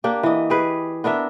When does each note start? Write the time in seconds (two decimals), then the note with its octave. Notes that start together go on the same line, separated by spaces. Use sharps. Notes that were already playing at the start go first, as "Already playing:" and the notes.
0.04 A#3 D4 G4
0.23 E3 D#5
0.50 G4 G#4 B4
1.04 B3 D4 A#4 E5